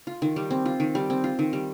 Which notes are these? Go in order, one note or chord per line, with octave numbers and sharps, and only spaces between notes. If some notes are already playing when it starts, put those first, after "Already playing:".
F4
D#3
G3
C4
F4
D#3
G3
C4
F4
D#3
G3